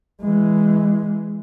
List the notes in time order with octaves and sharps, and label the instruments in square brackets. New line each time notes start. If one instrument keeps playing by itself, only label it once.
[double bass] E3 G#3